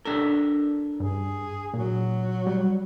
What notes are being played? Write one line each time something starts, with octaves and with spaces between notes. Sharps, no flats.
D4 A4 A#4
G2 G#4
A#2 F#3
G3